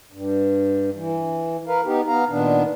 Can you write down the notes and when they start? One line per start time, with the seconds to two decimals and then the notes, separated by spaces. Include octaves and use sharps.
0.12 G2
0.95 E3
1.67 A#4 B4 F5
1.85 B3 D#4 G4
2.08 B3 F5 A#5
2.29 A#2 D#3 B3 D4